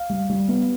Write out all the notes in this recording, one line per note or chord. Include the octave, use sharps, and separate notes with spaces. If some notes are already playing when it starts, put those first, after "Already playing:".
Already playing: F5
G3
G3
B3